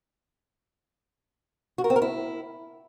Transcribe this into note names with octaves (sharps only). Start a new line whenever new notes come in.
F#4
A#4
C4
A#4
E4